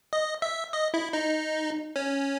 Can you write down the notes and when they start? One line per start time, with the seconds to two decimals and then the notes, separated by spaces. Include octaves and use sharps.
0.13 D#5
0.42 E5
0.73 D#5
0.94 E4
1.13 D#4
1.96 C#4